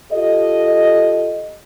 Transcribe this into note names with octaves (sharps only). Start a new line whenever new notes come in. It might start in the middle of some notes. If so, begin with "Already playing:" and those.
F4 G4 A4 D#5